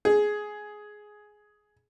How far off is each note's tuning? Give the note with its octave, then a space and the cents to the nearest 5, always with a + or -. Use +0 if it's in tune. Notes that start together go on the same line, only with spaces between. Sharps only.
G#4 +10